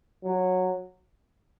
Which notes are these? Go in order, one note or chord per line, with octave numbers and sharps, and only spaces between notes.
F#3